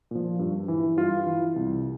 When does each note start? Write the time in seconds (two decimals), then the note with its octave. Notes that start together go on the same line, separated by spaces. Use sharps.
0.11 A#2 F3
0.39 G2
0.68 E3
0.97 G2 F4
1.26 E3
1.56 C2